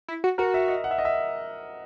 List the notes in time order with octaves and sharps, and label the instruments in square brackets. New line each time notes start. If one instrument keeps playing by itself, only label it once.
[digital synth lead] E4
F#4
[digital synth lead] F#4 [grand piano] A#4
[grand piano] E5
D#5
F#5
E5
D#5
E5